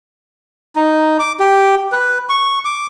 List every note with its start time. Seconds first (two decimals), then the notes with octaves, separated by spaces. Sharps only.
0.76 D#4
1.19 D6
1.40 G4
1.92 B4
2.29 C#6
2.65 D6